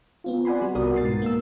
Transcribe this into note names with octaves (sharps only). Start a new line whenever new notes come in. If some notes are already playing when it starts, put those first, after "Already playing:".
B3 C4 F4
D5 F#5 G#5 B5 C6
G3 F#4
C2 B3 F#4 A#4 D5 D#6
G#2 B2 A6 C7
A#3 E6